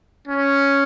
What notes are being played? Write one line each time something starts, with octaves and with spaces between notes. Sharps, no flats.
C#4